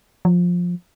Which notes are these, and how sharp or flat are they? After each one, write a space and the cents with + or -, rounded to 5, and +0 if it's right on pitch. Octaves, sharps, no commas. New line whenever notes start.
F3 +15